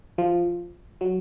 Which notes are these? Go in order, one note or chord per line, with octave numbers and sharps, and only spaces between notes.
F3
F#3